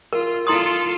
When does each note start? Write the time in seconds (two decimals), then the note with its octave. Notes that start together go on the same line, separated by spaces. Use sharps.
0.13 F4 A#4
0.47 E4 F4 A4 C6 D#6